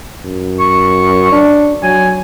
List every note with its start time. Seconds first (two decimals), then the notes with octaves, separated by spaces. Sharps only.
0.25 F#2
0.60 C#6
1.32 D4
1.83 F#3 G#5